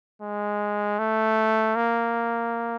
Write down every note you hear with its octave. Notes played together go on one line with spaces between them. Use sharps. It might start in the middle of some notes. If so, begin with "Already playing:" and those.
G#3
A3
A#3